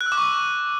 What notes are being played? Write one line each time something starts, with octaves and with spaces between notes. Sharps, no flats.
F#6
E6
D6
C#6